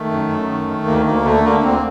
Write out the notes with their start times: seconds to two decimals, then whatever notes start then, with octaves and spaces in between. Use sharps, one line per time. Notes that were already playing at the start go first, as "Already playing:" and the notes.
Already playing: D#3 A3
0.09 F#2
0.28 F#2
0.47 D#3
0.67 D#3
0.86 D2 A#3
1.06 D2 A#3
1.25 D3 A3
1.44 D3 A#3
1.63 D2 C4